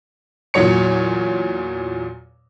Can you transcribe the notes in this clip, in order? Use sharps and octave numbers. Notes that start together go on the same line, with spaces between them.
E2 A#2 F#3 C#5 C#7